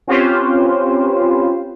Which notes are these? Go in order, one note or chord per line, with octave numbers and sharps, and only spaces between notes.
C4 C#4 F4 G4 B4 C5